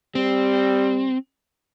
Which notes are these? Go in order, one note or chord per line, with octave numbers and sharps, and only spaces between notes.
G3 C4